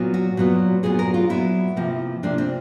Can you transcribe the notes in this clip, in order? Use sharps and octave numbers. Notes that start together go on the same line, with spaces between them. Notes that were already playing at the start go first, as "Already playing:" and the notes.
Already playing: A#2 F#3 B3
F#4
A#2 F#3 B3
A#2 F#3 B3 G#4
A#4
F4
A#2 F#3 B3 E4
C3 F3 A#3
C3 F3 A#3 D4
C4